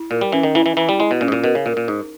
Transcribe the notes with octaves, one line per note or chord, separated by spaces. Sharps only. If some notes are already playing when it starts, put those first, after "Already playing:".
Already playing: E4
A#2 A#4
G3
E3 C#4
D#3
E3 E4
E3
E3 E4
G3
G#3 E4
B2
A#2 C#4
G#2
A#2
B2 A#4
C#3
A#2 A#4
A#2
G#2 D#4